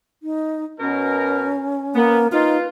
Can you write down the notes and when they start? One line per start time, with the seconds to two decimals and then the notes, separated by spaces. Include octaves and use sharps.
0.23 D#4
0.80 B2 C#4 A#4
1.95 A#3 B3
2.32 D#4 F4 B4